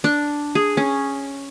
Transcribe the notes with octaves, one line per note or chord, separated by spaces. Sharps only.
D4
G#4
C#4